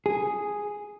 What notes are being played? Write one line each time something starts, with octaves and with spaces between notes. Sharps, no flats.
G#4